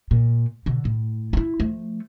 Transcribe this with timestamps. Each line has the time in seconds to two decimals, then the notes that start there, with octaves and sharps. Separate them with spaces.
0.11 A#2
0.66 B2 D3
0.85 A2
1.33 E4 F4
1.60 F3 A3